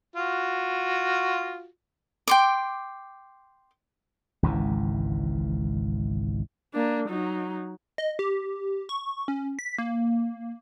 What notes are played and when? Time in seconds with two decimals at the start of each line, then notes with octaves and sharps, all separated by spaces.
0.16 F4 F#4
2.28 G5 C6 D6
4.43 G#1 C#2 G#2 E3
6.74 A#3 D4
7.09 F#3 D#4
7.98 D#5
8.19 G4
8.89 C#6
9.28 C#4
9.59 B6
9.78 A#3